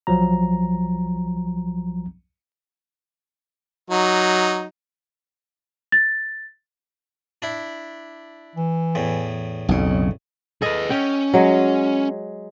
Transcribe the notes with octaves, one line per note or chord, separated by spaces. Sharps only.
B1 F3 F#3 A#5
F#3 D#4
A6
D4 E4
E3
E2 A2
B1 F2 C#3
G#4 A4 B4 D#5
C#4 G5
F#3 G#3